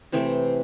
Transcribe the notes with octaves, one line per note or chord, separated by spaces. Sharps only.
C3 E3 A3 C4